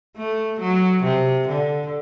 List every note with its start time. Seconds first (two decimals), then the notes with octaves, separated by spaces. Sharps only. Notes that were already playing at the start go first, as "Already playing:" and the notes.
0.17 A3
0.61 F#3
1.04 C3
1.49 D3